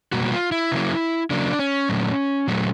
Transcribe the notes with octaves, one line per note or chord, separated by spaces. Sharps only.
B2 G3 A#3 F#4
F#4
F4
E4
C#3 F#3 A#3
C#3 F#3 A#3 D4
C#4
A#2 F#3 A3
A#2 F#3 A3